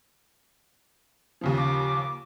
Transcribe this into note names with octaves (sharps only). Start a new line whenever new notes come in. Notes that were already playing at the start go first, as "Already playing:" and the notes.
D#2 C#3 F3
D6